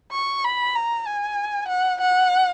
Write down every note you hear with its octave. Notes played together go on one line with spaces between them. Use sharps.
C#6
B5
A#5
G#5
F#5
F#5